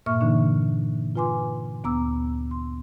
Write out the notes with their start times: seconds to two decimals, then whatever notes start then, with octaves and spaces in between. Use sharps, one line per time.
0.06 G2 A#2 A#3 E5 C#6 F6
0.21 D3 E3 A#3 D4 D#4
1.15 F4 B4 G#5 C6 D6
1.84 D2 B3 A#5 D6 E6
2.51 C6